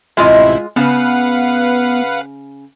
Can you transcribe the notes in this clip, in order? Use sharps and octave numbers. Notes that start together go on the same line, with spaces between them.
A1 C3 G#3 E4 F4 D#5
C#3 B3 B4 F5 F#5